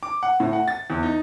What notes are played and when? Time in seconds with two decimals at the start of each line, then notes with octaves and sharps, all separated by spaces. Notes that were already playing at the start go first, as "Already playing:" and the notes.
0.03 D6
0.23 F#5
0.40 A2
0.53 F#5
0.68 A6
0.90 E2
1.03 D#4